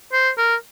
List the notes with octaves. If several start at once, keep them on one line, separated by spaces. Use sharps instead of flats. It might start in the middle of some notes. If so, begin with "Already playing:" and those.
C5
A#4